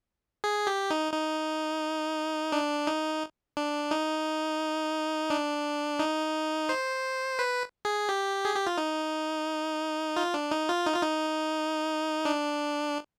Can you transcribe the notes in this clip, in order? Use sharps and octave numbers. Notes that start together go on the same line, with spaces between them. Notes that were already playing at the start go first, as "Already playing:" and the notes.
G#4
G4
D#4
D#4
D4
D#4
D4
D#4
D4
D#4
C5
B4
G#4
G4
G#4
G4
F4
D#4
F4
D4
D#4
F4
D#4
F4
D#4
D4